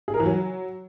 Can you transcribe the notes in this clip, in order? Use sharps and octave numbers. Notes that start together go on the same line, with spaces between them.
G#4
A#4
E3
F#3